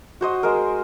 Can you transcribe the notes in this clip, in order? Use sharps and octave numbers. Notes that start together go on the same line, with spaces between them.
F#4 C5 D#5
G#3 A#4